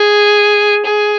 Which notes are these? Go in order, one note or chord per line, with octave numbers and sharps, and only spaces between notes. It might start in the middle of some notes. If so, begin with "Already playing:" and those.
Already playing: G#4
G#4